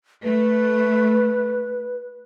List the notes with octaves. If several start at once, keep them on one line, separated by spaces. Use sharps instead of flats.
A3 B4